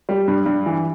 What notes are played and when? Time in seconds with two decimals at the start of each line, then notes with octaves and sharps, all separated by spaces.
0.09 G3
0.28 G2
0.46 G2
0.66 E3